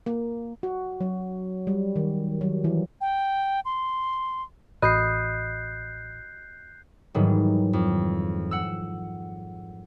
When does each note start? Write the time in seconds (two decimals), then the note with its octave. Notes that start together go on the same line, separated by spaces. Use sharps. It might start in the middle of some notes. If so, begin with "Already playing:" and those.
0.06 A#3
0.63 F#4
1.01 F#3
1.67 G3
1.96 D#3
2.41 F#3
2.64 E3
3.01 G5
3.65 C6
4.82 A1 F#4 D#5 B5 F#6 G6 C7
7.14 G#2 D#3 E3 F#3 G3
7.73 F2
8.51 F#5 E6